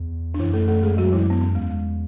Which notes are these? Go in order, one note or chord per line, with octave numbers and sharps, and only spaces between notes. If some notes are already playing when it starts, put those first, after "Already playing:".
Already playing: E2
D4
F#2 E3 E4
A3 A4
A3 A4
G#3 G#4
F#3 F#4
E3 E4
B3
C#4
E2 G#3